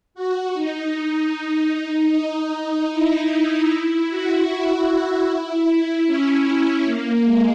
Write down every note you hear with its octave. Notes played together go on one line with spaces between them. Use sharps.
F#4
D#4
D#4
E4
E4
F#4
E4
C#4
A#3
G#3